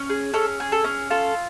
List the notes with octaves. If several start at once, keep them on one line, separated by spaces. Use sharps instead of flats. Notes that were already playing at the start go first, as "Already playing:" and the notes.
Already playing: C#4
G#4
C#4 A4
G#4
A4
C#4
F4 A4